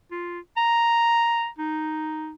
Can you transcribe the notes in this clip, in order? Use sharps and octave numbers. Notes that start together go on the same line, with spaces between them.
F4
A#5
D#4